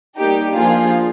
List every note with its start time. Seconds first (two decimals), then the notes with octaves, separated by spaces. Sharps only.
0.16 G3 A#3 D#4 G4
0.55 F3 A#3 D4 F4 G#4